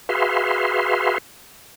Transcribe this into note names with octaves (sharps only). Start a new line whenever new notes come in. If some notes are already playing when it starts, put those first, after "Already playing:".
F#4 G#4 B4 E5 F5 C6